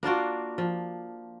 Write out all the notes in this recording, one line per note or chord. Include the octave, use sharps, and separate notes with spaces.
A#3 D4 F4 F#4
F3